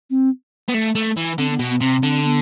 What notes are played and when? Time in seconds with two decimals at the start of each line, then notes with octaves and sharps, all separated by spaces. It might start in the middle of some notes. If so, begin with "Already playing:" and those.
0.10 C4
0.68 B3
0.74 A3
0.95 A3
1.17 E3
1.38 D3 C4
1.50 B3
1.59 B2
1.70 B3
1.81 C3 C4
2.03 D3
2.24 B3